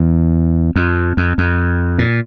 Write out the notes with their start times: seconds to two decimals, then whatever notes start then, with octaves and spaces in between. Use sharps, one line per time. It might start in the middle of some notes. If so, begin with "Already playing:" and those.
Already playing: E2
0.76 F2
1.17 F2
1.38 F2
1.98 A#2